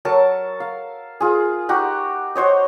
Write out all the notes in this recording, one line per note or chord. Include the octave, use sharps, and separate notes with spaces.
F#3 A4 A#4 A5
F5
F4 G#4
D#4 F#4 G4 F#5
F#4 C5 C#5 D#5